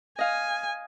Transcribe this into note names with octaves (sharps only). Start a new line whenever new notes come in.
D#5 F5 G#5